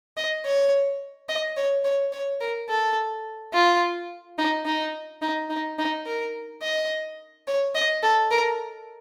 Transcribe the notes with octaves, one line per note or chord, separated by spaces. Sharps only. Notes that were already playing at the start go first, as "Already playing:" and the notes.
D#5
C#5
D#5
C#5
C#5
C#5
A#4
A4
F4
D#4
D#4
D#4
D#4
D#4
A#4
D#5
C#5
D#5
A4
A#4